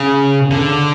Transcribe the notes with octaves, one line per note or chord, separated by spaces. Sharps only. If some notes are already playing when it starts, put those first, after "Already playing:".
Already playing: C#3
D3